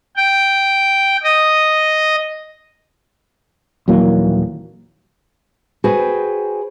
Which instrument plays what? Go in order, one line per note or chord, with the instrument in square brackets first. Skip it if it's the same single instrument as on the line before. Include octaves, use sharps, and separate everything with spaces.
[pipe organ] G5
D#5
[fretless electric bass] D#1 E3 F#3 A#3
[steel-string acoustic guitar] F#4 G#4 B4 C5 G5